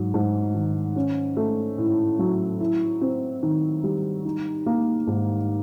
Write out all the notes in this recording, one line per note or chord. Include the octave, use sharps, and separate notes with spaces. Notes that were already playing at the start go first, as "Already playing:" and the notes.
Already playing: G#2 F#3
G#2
D#3
C#4
A3
A2
F#3
E4
C4
D#3
G3
D#4
A#3
G#2